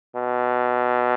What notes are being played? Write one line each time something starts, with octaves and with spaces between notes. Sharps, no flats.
B2